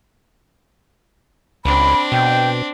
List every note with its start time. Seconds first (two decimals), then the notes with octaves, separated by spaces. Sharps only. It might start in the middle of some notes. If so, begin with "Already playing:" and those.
1.65 C#2 C4 D4 B5
2.12 B2 G5